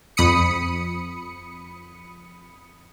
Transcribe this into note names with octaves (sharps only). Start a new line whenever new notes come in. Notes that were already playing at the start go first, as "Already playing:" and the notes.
F2 B5 D#6 C#7